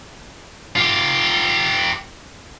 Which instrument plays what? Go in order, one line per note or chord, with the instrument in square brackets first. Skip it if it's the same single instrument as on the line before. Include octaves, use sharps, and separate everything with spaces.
[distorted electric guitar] F4 G4